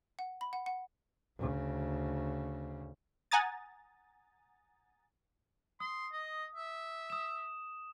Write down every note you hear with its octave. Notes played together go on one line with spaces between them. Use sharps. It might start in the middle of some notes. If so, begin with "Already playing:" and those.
F#5
B5
F#5
F#5
D2 C#3
F#5 G#5 A#5 D#6 A6
C6 D#6
D#5
E5
D#6 E7